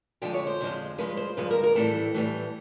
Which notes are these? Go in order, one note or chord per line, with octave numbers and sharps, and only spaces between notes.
F2 D3 F3 G#3 G5
C#5
C5
F2 D3 F3 G#3
G2 D3 F3 G#3 B4
C5
G2 D3 F3 G#3 B4
A#4
A#4
A2 E3 G3 A4
A2 E3 G3